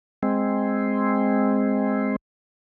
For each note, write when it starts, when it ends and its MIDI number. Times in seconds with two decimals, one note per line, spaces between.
0.23 2.16 56
0.23 2.16 60